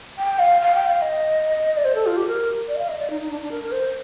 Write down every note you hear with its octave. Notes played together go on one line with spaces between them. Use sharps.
G5
F5
F5
G5
F5
D#5
D5
C5
A4
F4
G4
A#4
D5
D#5
F5
D#5
D5
D#4
D#4
D4
D4
A#4
A#4
C5